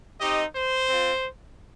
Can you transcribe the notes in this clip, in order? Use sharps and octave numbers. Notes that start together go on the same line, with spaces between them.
C4 D#4 G4 D#5
C5
C4 F4